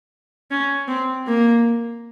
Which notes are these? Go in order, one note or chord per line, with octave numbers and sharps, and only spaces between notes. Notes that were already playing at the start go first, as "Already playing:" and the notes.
C#4
C4
A#3